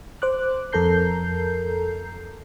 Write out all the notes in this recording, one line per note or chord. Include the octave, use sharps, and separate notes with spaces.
C5 D6 F#6
F2 A4 A#4 A#5 G6 C7